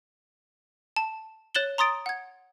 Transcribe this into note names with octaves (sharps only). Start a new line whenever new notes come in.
A5
C#5 F#6 A6 E7 F#7 G7
A#5 C6 D#6 A6 D7
F#5 G#6